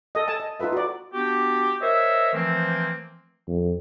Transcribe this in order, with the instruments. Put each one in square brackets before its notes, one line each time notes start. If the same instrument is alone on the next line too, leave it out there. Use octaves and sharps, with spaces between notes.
[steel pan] A4 D#5
A4 G#5 A5
D#5
D#4 F4 A4 B4 E5
F#4 D5
[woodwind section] B3 D4 F#4 G4
A#4 C5 C#5 D#5 E5
E3 F3 A3 A#3 C4
[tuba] F2